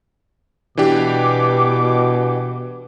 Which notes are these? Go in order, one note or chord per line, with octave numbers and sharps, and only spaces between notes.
B2 E3 D4 G4 D6